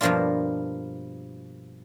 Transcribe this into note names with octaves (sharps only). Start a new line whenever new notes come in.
G2 B2 F3 A#3 D4 F4